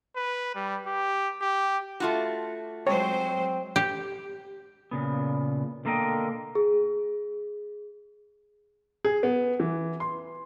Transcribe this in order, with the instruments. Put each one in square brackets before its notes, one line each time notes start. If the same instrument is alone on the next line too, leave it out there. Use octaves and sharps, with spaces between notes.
[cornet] B4
G3
G4
G4
[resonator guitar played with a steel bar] A3 F4 F#4
[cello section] F#3 G#3 C5 [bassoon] C4 [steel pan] C#5
[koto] G4
[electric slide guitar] A#2 C#3 B3
B2 D3 A#3 A#4 D#5 G5
[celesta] G#4
[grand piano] G#4
B3
E3
C6